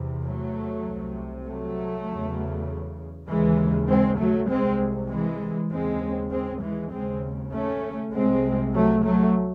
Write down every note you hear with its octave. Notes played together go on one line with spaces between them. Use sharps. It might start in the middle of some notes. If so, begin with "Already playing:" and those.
Already playing: E2 C3
F#3 A3
C2 C3
F#3 A3
E2 C#3
D#2 C#3 E3 G#3
G#3 C4
F#3 A3
C2 C3 G#3 C4
E3 G#3
D#2 C#3 G#3 C4
G#3 C4
E3 G#3
D#2 C#3 G#3 C4
A3 C#4
C2 C3 G#3 C4
F#3 A3
F#3 A3